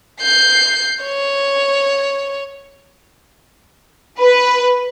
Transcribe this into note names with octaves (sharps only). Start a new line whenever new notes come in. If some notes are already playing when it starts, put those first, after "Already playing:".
G6 C7
C#5
B4